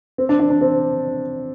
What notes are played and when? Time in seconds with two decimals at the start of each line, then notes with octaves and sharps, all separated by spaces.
0.18 C4
0.29 D4
0.40 D4
0.50 D4
0.61 C4